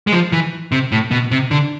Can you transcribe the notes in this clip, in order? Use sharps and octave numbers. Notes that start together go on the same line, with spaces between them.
G#3
F3
E3
C3
A2
B2
C3
D3